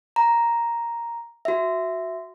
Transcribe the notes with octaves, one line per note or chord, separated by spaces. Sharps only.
A#5
F#4 E5